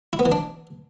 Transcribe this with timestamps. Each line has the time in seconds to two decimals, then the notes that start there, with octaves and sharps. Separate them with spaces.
0.13 E4
0.19 B3
0.25 E3
0.32 D4